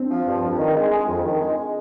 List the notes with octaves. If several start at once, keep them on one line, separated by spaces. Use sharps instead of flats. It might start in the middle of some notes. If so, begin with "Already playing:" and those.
Already playing: C4 D4
F3
G2
F2
D#3
G#3
G#3
F2
D#3
G#3
G#3